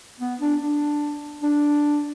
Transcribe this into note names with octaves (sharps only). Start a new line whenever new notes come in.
B3
D4
D4
D4